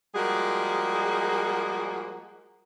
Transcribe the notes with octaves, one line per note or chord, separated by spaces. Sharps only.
F3 G3 G#3 A#3 F#4 G#4